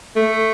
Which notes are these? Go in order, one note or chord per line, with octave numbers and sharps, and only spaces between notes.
A3